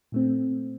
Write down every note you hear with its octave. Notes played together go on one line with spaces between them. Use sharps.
A#2 A3 C4